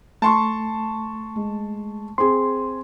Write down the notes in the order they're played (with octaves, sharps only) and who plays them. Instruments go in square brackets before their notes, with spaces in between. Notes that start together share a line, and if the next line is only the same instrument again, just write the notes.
[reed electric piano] A3 [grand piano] A5 C6 C#6
[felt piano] G#3
[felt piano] C4 G#4 [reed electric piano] C6